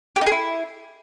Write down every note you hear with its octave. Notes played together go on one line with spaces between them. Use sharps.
G4
D#4
G#4
E4